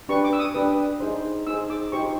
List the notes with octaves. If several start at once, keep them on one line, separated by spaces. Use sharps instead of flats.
D4 G4 B4 C#6
D6
E6
D#6
D4 G4 B4
D#4 G#4 C5
D#4 G#4 C5 E6
D6
D#4 G4 C5 C#6